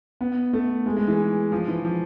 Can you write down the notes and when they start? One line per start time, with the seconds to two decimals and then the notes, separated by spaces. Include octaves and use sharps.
0.21 B3
0.53 A3
0.86 G#3
0.97 G#3
1.08 E3
1.52 F3
1.68 E3
1.85 F3